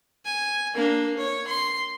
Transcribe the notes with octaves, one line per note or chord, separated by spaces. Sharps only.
G#5
A#3 D4
C#5
C6